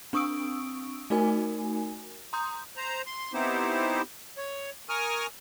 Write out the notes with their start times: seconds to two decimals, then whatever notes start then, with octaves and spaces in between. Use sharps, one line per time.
0.13 C4 D4 C#6 D#6 E6 D7
1.10 A3 D#4 F#4 A#4 G#5
2.33 A#5 C6 D#6 G6
2.77 C5 A#5
3.07 C6
3.34 B3 C4 D#4 E4 G4 C5
4.38 C#5
4.89 A#4 G#5 C#6 D#6 F6